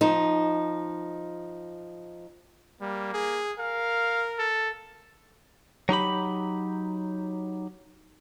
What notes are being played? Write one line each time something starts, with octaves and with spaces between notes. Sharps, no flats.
F3 D#4
G3 A#3
G#4
A#4 F5
A4
F#3 D#4 G4 B5